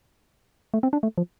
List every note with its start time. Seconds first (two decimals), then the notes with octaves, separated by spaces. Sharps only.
0.74 A3
0.83 C4
0.93 D4
1.03 A3
1.18 F3